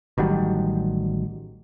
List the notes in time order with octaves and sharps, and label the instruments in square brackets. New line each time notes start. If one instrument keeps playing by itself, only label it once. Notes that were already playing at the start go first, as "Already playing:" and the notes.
[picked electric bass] A1 D#3 F#3 G3